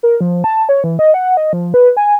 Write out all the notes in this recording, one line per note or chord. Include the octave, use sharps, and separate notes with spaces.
A#4
F3
A5
C#5
E3
D#5
F#5
D#5
F3
B4
G#5